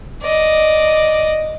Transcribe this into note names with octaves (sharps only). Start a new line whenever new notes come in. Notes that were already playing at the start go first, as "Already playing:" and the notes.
D5 D#5